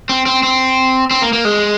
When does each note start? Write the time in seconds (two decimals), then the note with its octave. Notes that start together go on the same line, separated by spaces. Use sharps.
0.09 C4
0.26 C4
0.43 C4
1.11 C4
1.22 A#3
1.33 A#3
1.45 G#3